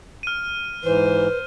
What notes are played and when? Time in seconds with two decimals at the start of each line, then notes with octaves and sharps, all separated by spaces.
0.23 F6 D#7
0.84 G#2 E3 B4 C5